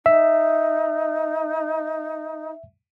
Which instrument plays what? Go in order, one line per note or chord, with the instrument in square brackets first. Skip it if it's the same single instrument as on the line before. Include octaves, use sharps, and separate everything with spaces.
[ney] D#4 [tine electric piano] E5